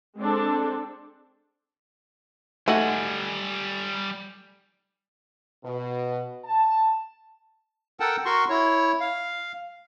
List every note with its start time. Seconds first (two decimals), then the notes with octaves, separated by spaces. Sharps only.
0.19 G#3 C4 D4 A4
2.68 G3 A3 D#4 F#4 G#5
5.65 B2
6.45 A5
8.00 A4 A#4 F#5 G5 A5
8.25 F#4 A#4 C6 C#6
8.49 E4 C#5
9.00 F5